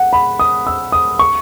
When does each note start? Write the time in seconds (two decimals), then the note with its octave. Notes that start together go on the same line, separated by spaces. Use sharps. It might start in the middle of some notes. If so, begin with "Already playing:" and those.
Already playing: F#5
0.13 B5
0.39 D#6
0.67 E6
0.92 D#6
1.19 C#6